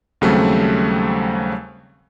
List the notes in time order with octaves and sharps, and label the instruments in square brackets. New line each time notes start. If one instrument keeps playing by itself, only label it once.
[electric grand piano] D#2 C#3 F#3 G3 A3 C4